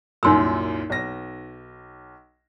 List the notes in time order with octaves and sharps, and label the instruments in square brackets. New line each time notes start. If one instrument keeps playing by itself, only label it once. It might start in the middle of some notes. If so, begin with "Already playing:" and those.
[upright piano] C2 F#2 A#2 [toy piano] D#4 C6 E6
[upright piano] B1 A#6